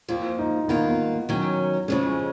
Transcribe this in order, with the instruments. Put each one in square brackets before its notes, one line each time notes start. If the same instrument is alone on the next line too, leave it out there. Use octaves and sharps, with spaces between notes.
[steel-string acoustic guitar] F2 F3 A#3 [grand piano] F4
[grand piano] D#4
[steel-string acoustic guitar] D#3 A#3 F4 [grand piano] B3
[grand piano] B3
[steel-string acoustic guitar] D#3 F#3 C#4
[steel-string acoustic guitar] F2 C#3 F3 G#3 [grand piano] C#4